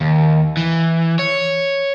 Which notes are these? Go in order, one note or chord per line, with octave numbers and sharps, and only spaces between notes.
D#2
E3
C#5